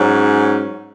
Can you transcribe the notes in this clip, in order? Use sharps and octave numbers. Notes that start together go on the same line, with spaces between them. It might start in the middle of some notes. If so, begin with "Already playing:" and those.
Already playing: G#2 F#3 C#4